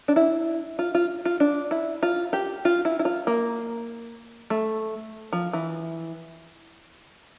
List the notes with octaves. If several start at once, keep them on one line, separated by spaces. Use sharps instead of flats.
D4
E4
F4
F4
F4
D4
E4
F4
G4
F4
E4
E4
F4
A#3
A3
F3
E3